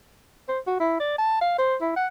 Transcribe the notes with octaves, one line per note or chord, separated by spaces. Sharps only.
C5
F#4
E4
D5
A5
F5
C5
E4
F#5